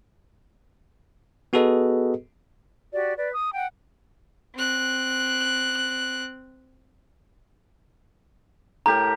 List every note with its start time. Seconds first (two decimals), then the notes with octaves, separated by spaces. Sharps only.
1.53 B3 F#4 G#4 A4 B4 D#5
2.94 F#4 G4 D5
3.16 B4 D5
3.34 D#6
3.54 F#5 G5
4.55 C4 F#6
8.86 A2 G4 A#4 A#5